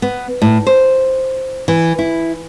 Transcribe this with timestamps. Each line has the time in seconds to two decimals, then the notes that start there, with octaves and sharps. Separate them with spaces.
0.02 B3
0.42 A2
0.67 C5
1.68 E3
1.99 E4